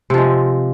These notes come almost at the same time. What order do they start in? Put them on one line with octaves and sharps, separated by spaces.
C3 F3 G#3